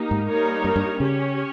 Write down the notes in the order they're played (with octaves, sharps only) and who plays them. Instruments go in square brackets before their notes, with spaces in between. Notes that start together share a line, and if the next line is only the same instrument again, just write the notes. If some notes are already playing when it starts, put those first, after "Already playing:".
Already playing: [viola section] A#3 D#4 G4
[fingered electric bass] G#2
[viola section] G3 A#3 D#4 A#4 C#5
[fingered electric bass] G2
G2
[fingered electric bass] C#3 [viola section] C#4 G4 C#5